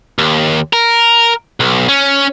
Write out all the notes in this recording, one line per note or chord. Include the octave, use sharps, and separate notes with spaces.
D#2
A#4
B1
C#4